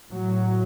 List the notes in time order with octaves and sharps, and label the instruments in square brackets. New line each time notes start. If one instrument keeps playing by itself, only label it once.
[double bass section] A2 F#3